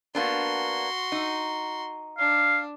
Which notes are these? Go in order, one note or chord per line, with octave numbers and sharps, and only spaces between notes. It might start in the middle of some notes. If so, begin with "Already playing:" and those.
A#3 B3 D4 F#4 C6
D#4
D4 F5